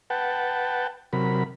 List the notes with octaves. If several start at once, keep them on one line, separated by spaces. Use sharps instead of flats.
B4 F#5 G5 A5
C3 F#3 A#4 B5